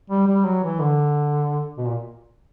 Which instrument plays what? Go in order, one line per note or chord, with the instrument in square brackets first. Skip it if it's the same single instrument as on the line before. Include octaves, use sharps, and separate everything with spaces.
[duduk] G3
G3
F#3
E3
D3
B2
A#2